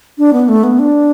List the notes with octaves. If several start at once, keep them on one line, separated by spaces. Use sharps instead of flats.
D4
B3
A3
B3
D4